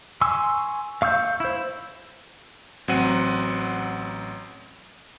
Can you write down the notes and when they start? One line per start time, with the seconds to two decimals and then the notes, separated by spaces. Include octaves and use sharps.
0.21 G#5 C6 C#6 E6
1.02 F5 C#6 E6 G6
1.40 E4 C5
2.88 A1 F#3 C4 F#5 D#7